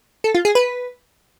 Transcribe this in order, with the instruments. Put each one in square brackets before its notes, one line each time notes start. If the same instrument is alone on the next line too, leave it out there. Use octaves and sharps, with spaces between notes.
[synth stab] A4
F4
G#4
B4